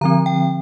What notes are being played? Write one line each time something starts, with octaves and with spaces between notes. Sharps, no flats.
D3 F3 C4 A#5
G5